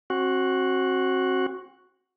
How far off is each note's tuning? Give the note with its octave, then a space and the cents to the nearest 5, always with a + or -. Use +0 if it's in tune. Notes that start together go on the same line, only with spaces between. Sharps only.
C4 +35 F#4 +0